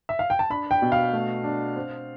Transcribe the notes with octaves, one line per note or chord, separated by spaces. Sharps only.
E5
F5
G5
A5
D4 B5
G5
B2
F5
A3
D4
C4